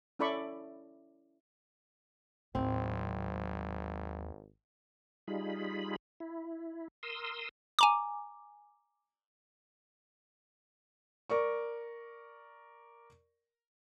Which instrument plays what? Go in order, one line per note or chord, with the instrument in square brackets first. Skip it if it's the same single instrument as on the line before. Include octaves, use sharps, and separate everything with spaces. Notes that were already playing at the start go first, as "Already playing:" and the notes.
[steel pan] C#4 E4 A4 D5 B5 C#6
[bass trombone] G#1 [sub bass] D#2 [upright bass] A2 F#3 [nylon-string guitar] C4
[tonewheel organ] G3 D#4 F4 G#4 B5
E4
A#4 C6 D#6 E6
[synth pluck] G#5 A#5 D6
[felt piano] A#4 D5 C#6